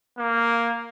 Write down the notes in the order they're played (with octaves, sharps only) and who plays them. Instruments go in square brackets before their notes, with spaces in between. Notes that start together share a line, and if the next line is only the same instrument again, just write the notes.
[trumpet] A#3